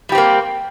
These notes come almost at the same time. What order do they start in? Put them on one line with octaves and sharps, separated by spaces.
G3 G4 C4 A#3